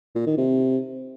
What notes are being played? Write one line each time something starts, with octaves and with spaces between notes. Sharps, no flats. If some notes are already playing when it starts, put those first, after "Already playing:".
A#2
D#3
C3